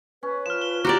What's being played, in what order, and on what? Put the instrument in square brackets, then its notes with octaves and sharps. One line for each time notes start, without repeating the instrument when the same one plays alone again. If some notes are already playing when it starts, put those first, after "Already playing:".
[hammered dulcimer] C#4 [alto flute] B4
[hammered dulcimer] F3 [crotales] F6 E7
[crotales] G7
[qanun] F#4 G4 D5 [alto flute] A#5 [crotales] D6